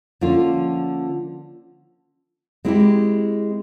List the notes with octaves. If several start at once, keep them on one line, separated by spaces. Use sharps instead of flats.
D3 F3 A#3 C#4 F4
G#3 C4 E4 G4